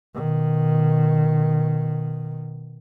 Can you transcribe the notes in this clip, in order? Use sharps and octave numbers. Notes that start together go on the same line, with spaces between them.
B2 D#3